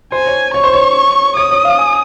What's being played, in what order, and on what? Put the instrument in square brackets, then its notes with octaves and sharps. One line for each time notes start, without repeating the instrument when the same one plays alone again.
[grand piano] C5 [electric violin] G#5
[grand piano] C#5
[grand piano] C#5 [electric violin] C#6
[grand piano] C5
C#5
[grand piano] C#5 [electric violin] D#6
[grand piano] C#5
F5
G#5